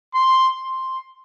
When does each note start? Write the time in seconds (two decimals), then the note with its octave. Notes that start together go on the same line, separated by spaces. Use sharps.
0.15 C6
0.63 C6